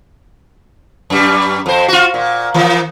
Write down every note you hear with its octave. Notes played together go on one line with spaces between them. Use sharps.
F#2 G3
F2 C5
F4 F#4
A#2
E3 A#3